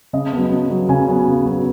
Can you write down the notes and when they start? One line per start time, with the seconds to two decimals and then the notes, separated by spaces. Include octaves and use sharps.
0.13 C#3 D#5
0.33 F#3 B3
0.52 C#3
0.70 F#3 B3
0.89 C#3 G#5
1.08 F#3 B3
1.28 C#3
1.46 F#3 B3